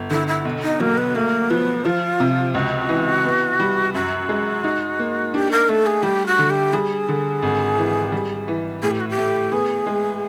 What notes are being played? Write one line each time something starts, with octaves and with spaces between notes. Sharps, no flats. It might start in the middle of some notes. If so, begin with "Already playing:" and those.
Already playing: G1
D3 E4
E4
B1
D#4
F#3 A#3
B3
A3 A#3
F3 B3
F3 F4
C3
C#2 F#4
E3
B3
G3
F#2 F#4
G#3
D#4
A#3
D4 G4
A#4
A3 A4
G#4
G3 G4
F#4
D3
G4
G3 G#4
D3
G#1
E3
G3
E3
A2 G#4
G4
F#4
G4
A3
B3 G#4
G#3